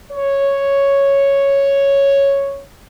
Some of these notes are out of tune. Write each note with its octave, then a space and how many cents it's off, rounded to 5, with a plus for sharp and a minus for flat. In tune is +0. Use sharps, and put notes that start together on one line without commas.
C#5 +0